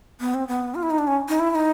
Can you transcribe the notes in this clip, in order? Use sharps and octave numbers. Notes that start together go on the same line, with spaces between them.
B3
C4
B3
F4
E4
D#4
D4
C#4
D#4
E4
E4
D#4